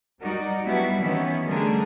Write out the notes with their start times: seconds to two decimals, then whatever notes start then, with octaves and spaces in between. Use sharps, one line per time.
0.21 G3 D#4 F#4 A#4 D5
0.64 F#3 G3 B3 D4 E4 F#4
1.00 D#3 E3 B3 C#4 E4
1.48 D3 G3 A3 D4 G#4 A#4